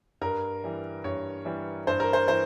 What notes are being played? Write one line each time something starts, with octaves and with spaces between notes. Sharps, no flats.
G2 A#4
E3 G3
G2 C#5
E3 G3
G2 C5
A#4
C5
E3 C5